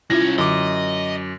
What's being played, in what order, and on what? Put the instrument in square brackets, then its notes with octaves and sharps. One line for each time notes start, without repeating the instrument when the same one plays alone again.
[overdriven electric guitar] C2 C#4 [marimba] E4 F4 E5 [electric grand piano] A#6
[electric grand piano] F#2 D6 [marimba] D3 [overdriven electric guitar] D#5